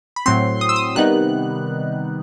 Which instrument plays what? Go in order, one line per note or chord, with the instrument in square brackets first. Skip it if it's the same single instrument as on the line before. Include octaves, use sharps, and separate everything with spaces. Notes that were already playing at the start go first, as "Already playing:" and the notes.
[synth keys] B5
A2 F#3 C4 C6
D#6
E6
D#6
C3 D#3 G3 B3 D#4 F#6